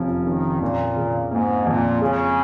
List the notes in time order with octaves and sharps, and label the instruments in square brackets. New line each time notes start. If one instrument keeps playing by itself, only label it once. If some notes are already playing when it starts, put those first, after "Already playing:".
Already playing: [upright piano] F1 F3 C#4
[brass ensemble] D#3 [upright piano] C#4
[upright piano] F2 [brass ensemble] A#2
[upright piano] C#3
[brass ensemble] G#2 [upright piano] A#3
[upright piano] F2 [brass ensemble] A#2
[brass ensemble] C#3 [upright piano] G#3